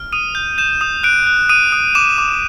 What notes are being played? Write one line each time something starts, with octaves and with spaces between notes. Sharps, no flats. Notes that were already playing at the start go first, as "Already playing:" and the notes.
Already playing: F6
D#6 D#7
G6
G6 E7
D#6
F#6 D7
F#6
D#6 D#7
D#6
D6 E7
D6